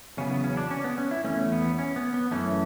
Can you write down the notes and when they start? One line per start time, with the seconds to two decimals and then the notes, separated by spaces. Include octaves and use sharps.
0.17 E2 C#3 F#3 B3 C#4
0.31 B3
0.44 C#4
0.57 D4
0.71 C#4
0.84 B3
0.98 C#4
1.11 E4
1.24 E2 B2 A3 C#4
1.52 B3
1.79 C#4
1.96 B3
2.14 B3
2.31 F#2 E3 A3 C#4